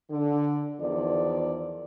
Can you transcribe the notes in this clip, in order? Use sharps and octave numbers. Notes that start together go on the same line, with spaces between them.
D3
E2 D#3 F3 D5